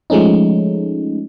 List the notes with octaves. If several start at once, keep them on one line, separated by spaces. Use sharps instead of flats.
F3 G#3 A3 C#4 D#4